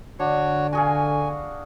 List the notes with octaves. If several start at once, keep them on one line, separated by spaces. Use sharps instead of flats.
D3 D4 F#4 C#5
F#4 G#4 F5 G#5